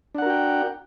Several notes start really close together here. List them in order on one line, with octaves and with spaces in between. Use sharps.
D4 F#5 A#4 F#4 G5